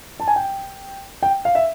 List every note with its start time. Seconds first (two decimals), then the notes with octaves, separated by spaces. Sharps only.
0.20 A5
0.27 G#5
0.36 G5
1.23 G5
1.45 F5
1.55 E5